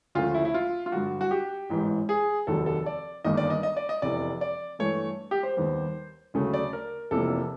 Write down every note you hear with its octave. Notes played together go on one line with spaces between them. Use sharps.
D2 C#3 F3 A3 F4
E4
E4
F4
F4
G2 D3 F#3 F#4
F#4
G4
A1 G#2 E3
G#4
F1 D#2 D#3 F#3 A4
A4
D5
G1 G2 D#3 G3 A#3 D#5
D5
D#5
D#5
D5
D#5
F1 E2 C3 D5
D5
G2 E3 A3 C#5
G4
C5
D#2 D#3 G3 B3
D2 C#3 F#3 A3
D5
A#4
F1 E2 C3 F3 A#3 A4